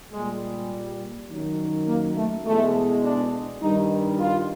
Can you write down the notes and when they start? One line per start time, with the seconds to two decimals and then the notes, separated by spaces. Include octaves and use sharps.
0.13 A#2 G3 G#3
1.29 F#2 D#3 F#3
1.87 A#3
2.16 A3
2.45 E2 B2 G#3 A3
3.04 D4
3.62 G2 D#3 G3 D#4
4.20 F4